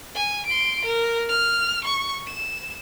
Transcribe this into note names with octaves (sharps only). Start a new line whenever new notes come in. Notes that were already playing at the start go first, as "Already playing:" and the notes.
G#5
C6 D7
A#4
F6
C#6
E7